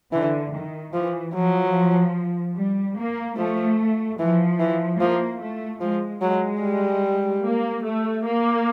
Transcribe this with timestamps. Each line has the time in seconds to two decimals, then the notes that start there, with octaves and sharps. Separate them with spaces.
0.13 D3 E3
0.53 D#3
0.94 E3 F3
1.34 F3 F#3
2.56 G3
2.97 A#3
3.37 F3 A3
4.19 E3 F3
4.60 E3
4.99 F3 A#3
5.40 A3
5.81 F3 G#3
6.21 F#3 G#3
6.63 G3
7.44 A#3
7.84 A3
8.25 A#3